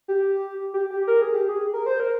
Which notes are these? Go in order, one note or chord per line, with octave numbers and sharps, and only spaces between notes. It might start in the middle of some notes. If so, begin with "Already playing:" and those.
G4
G4
G4
A#4
G#4
G4
G#4
A#4
C5
A#4